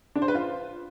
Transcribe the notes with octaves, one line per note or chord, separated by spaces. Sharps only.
D4
C5
B4
F4